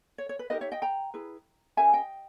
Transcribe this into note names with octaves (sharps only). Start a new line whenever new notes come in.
C#5
C#5
B4
D#4 G4 A#4 B4 D#5
C#5 E5
D#5 G5
G5 A#5
E4 G#4 B4
C#4 G4 A#4 E5 G#5
D#5 G5